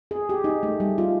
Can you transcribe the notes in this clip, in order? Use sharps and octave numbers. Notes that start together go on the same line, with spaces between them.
G#4
G4
D#4
A3
G3
F4